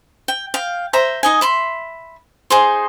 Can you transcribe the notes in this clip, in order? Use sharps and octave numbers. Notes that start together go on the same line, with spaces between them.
G5
F5 G5
C5 E5 A#5
D#4 D#5 G#5
E5 B5 C6
D#4 G#4 C5 C6